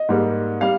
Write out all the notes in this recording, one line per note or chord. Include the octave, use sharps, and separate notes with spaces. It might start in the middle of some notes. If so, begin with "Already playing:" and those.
Already playing: D#5
G#2 G3 A#3
G3 F5